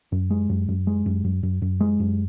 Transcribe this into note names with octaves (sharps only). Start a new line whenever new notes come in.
F#2
G#3
F#2
F#2
G#3
F#2
F#2
F#2
F#2
G#3
F#2